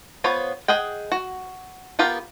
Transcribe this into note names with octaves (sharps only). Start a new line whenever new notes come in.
B3 F4 C5 C#5 B5
G#4 D#5 F#5 G5
F#4
B3 F4 G4 A#4